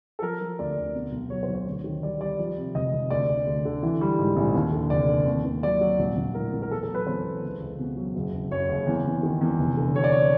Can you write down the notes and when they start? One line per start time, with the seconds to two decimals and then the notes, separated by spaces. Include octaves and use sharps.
0.19 A4
0.22 F3 A#4
0.40 F3
0.59 D2 D5
0.77 D2
0.95 B2
1.12 B1
1.30 F#3 C#5
1.43 C5
1.48 B1
1.54 C#5
1.67 D2
1.84 D#3
2.03 G3 D5
2.20 G3 D5
2.39 F3
2.57 C3
2.75 F1 D#5
2.93 F1
3.10 D2 D5
3.29 D2
3.47 D2
3.65 D3
3.83 E3
4.01 G3
4.19 G#2
4.36 A#1
4.54 D#2
4.73 D3
4.90 F1 D5
5.08 D3
5.26 D#2
5.45 D#2
5.63 F#3 D5
5.81 F#3
5.99 A#1
6.17 A#1
6.35 A2 A#4
6.53 A#1
6.62 A#4
6.71 E2 A4
6.83 A4
6.89 F#3
6.95 B4
7.07 E2 C5
7.24 E2
7.42 C#2
7.60 C#2
7.79 B2
7.97 F#3
8.15 F#1
8.33 F#1
8.51 F#2 C#5
8.69 F#1
8.87 E2
9.05 E2
9.23 D#3
9.41 E2
9.59 F1
9.77 D3
9.95 D3 C#5
10.04 D5
10.12 C#5